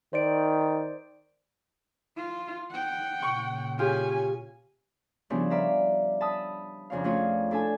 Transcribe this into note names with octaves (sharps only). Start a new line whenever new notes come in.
D#3 C5 D5 D7
F4
F#5 G5
A#2 C#3 C#6
C#4 F4 G4 G#4 G#5
C#3 F3 G3 B3 D4 E4
B4 D5 E5 F5 A#5
A5 B5 D#6 E6
F2 C#3 D4 C#5 F5
A3 C#4 D4 F4 G#4 C#5
D4 E4 A4 G#5